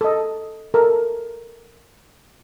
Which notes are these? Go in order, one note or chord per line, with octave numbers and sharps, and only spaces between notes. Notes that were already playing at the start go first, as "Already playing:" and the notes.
A4 D#5
A4 A#4